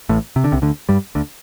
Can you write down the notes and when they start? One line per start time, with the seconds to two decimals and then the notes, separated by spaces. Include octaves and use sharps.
0.09 A1 A2
0.36 C3
0.44 D3
0.52 C2 C3
0.62 D2 D3
0.89 G2 G3
1.15 D2 D3